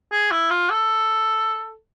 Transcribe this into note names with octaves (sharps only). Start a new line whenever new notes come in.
G#4
E4
F4
A4